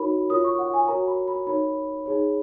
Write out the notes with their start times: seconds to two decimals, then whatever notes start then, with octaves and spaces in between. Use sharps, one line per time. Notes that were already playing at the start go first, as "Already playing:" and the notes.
Already playing: D#4 F#4 A#4 C#5 B5
0.29 F4 A#4 C#5 D#6
0.44 C#6
0.59 F#5
0.74 G#5
0.88 F#4 A#4 C#5 A#5
1.08 B5
1.28 B5
1.47 D#4 A#4 C#5 B5
2.06 D#4 G#4 C#5